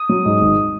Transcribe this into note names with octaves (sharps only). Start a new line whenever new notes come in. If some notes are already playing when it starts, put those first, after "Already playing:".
Already playing: D#6
F#3
G#2
G#1